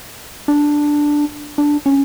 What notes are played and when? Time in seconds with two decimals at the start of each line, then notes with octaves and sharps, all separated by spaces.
0.48 D4
1.58 D4
1.86 C#4